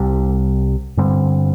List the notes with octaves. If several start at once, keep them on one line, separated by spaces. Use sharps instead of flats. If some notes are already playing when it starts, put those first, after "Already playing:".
Already playing: C2 C3 G3
G2 D3 G3 C4